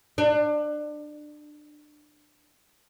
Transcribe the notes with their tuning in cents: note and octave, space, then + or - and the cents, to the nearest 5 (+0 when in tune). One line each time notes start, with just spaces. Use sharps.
D4 +25